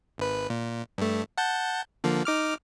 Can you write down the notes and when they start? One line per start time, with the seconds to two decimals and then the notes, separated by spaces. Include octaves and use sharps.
0.18 G#1 B4
0.50 A#2
0.98 G2 A3
1.38 F#5 A5 G6
2.04 D3 F3 A#3
2.25 D#4 D6 F6